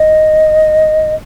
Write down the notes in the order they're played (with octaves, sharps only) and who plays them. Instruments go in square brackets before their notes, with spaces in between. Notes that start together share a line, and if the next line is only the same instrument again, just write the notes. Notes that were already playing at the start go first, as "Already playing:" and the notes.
Already playing: [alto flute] D#5